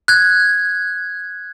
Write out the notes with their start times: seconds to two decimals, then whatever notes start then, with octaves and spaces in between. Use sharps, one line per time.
0.08 F#6 G#6